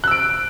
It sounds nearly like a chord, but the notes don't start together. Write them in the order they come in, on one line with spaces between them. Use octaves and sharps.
F#6 E6 D7